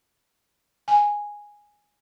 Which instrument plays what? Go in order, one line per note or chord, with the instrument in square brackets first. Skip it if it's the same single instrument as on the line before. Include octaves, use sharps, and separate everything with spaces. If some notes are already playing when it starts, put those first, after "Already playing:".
[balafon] G#5